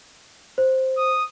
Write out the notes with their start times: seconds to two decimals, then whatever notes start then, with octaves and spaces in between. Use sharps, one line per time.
0.58 C5
0.98 D#6